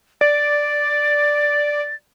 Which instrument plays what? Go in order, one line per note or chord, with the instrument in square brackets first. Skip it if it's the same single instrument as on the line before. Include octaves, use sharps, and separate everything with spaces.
[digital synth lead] D5 [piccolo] A6